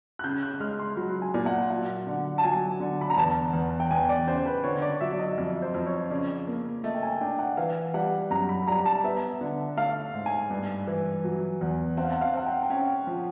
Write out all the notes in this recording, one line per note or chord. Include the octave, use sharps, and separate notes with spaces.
F#6
C#3 G6
F#6
G#3 F6
C6
F#3 B5
G#5
A#2
F#5
F#3 F#5
D3
A5
F#3 G#5
D3
B5
A#5
E2 A5
E2
G5
E2 G#5
D5
C#3 C5
B4
D3 C#5
D5
F#3 E5
D5
D#5
F2
C5
F2
C#5
C#3 D5
A#3
A3 D#5
G5
G#5
D4 G5
F#5
E3 F5
G3 F#5
F#2 A#5
B5
G3 A#5
A5
B3 E5
D3
A3 F5
G#2
G#5
G2
E3
F#3
E2
C4 F#5
F5
F#5
F5
C4 F#5
G5
G5
C#4 F#5
F3